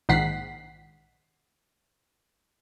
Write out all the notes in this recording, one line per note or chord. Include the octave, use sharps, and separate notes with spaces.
A#1 G#2 D#3 F#5 B6 C7